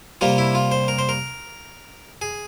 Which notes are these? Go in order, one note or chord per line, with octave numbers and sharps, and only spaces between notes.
C3 G3 A#3 F4
E4
F4
C5
A#4
C5
A#4
G#4